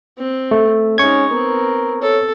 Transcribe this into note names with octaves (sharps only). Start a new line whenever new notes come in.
C4
A3
G#3 C#4 D#4 C#6 G#6
B3 C4 A#4
A4 C#5